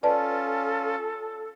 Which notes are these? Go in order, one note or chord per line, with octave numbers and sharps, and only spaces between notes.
C#4 F4 A4 B4 D5 A5